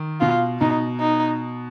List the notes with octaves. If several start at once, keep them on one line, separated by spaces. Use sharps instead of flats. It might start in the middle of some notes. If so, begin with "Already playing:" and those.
Already playing: D#3
B2 F4
B2 D#4
D#4